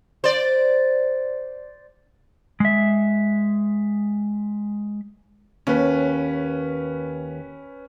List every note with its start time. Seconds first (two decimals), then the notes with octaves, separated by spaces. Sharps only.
0.24 C5 D5
2.60 G#3 E5
5.67 D#2 C#4 B4